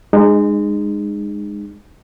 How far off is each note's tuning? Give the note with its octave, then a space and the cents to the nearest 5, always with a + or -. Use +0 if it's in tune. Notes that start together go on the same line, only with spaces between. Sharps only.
G#3 -10 D#4 -35